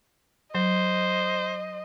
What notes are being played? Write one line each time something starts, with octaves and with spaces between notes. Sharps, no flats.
F#3 C5 D#5